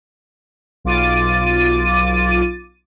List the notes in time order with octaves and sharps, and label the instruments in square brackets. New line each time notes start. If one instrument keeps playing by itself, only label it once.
[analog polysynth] B1 F4 D6 A6 D#7